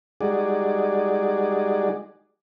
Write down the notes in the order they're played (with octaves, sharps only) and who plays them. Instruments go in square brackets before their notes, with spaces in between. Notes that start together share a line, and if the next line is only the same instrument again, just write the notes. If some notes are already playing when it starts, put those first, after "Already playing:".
[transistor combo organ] G3 G#3 D#4 F#4 G#4 D5